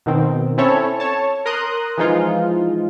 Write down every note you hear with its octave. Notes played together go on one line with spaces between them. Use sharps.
B2 D#3 C4
C4 C#4 E4 A4 C#5
C#5 A5
A#4 A#5 C6 D#6 F#6
E3 F3 G#3 D#4 F4